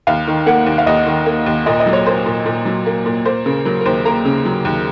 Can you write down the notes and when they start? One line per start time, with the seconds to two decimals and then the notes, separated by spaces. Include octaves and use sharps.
0.07 D#2 F5
0.27 D#3
0.46 A#3 F#5
0.66 D#2
0.78 F5
0.86 D#2 D#5
1.07 D#3
1.26 A#3
1.46 D#2
1.66 A#2 D#5
1.80 D#5
1.86 F#3
1.93 C#5
2.06 A#3 C5
2.26 A#2
2.46 A#2
2.65 F#3
2.86 A#3
3.06 A#2
3.25 A#3 C5
3.45 C#3 A#4
3.65 F#3 A#4
3.81 A#4
3.85 D#2 C5
4.05 A#3 A#5
4.25 C#3
4.45 F#3
4.65 D#2